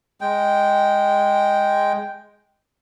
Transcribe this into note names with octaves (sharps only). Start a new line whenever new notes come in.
G#3 G5